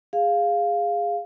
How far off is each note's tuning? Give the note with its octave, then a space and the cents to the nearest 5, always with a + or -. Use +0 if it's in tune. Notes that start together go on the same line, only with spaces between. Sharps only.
G#4 -15 F5 +0